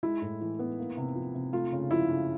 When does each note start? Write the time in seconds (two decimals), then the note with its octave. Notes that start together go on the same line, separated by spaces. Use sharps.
0.03 G#3 E4
0.22 A2
0.41 E3
0.59 B3
0.79 A#3
0.97 C3
1.15 F3
1.35 C3
1.53 A3 F4
1.72 C#3
1.90 F3 E4
2.09 C#3